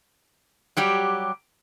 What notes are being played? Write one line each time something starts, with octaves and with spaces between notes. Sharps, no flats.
F#3 G3 G4